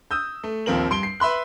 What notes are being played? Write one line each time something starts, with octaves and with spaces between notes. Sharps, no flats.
D#6 E6 G6
A3
A#1 D#2 F3 C4 A#4 F#7
G2 C6 D7 G7
C7
B4 E5 B5 C6 F#6